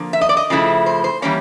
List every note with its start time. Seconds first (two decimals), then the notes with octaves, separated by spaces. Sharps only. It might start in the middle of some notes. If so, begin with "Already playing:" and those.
Already playing: D3 F3 A#3
0.13 E5
0.21 D#5
0.29 D5
0.37 D#5
0.50 C#3 F3 A3 C4 E4
0.86 C5
1.04 C5
1.22 E3 G3 A#3 C#4 C#5